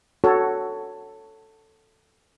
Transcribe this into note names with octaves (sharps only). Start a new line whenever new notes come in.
F#4 A4 C#5